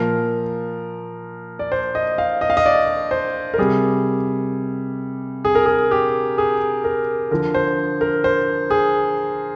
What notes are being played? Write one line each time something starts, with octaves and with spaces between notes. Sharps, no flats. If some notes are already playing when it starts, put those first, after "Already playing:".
Already playing: A#2 F3 A#4
D5
C5
D#5
F5
D#5
F5
D#5
D5
C5
A#4
C3 G3 G#4
G#4
A#4
G#4
G4
G#4
A#4
D3 F3 A#4
C5
A#4
C5
G#4